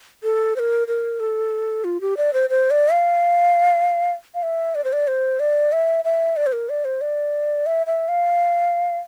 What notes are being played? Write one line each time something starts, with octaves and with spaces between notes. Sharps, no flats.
A4
C5
A#4
A#4
A4
F4
G4
D5
C5
C5
D5
F5
F5
E5
D5
C5
D5
C5
D5
E5
E5
D5
C5
A#4
D5
C5
D5
E5
E5
F5